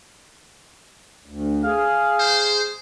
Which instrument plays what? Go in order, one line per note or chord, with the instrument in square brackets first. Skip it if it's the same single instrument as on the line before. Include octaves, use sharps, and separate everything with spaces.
[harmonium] D2
[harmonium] G#4 [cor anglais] F5
[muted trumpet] C5